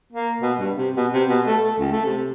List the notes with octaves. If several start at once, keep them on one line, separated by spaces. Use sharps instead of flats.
A#3
B2
G2
C3
B2
C3
B2
A3
A3
C#2
A3
C3